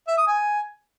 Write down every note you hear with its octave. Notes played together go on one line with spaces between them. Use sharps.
E5
D#6
G#5